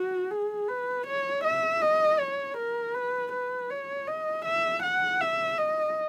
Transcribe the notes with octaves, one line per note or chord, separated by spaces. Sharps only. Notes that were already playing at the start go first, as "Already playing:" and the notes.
Already playing: F#4
G#4
B4
C#5
E5
D#5
C#5
A#4
B4
B4
C#5
D#5
E5
F#5
E5
D#5